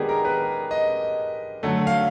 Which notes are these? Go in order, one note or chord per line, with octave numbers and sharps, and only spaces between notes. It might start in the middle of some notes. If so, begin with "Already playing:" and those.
Already playing: D#3 G#3 B3 D4 G4 G#4
A#4
B4
D#5
D3 F#3 A3
F5